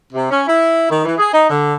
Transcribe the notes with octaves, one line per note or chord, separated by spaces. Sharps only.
C3
C#4
E4
D#3
E3
G#4
D#4
D3